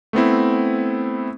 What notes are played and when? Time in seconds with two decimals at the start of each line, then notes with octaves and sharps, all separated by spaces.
0.13 A3 B3 C4 E4